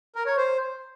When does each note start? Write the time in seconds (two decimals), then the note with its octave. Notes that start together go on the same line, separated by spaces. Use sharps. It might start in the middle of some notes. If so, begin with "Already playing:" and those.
0.16 A#4
0.26 C#5
0.37 C5